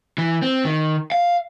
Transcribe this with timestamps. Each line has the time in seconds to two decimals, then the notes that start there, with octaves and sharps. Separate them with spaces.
0.18 E3
0.42 C4
0.65 D#3
1.12 F5